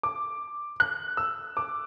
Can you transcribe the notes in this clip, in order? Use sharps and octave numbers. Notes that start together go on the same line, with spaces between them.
D6
F#6
E6
D6